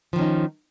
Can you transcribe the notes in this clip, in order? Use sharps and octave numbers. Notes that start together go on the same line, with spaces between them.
D#3 F3 C#4 D#4